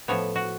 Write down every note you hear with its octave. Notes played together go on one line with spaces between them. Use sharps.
A2 F3 B3 C#5
F#4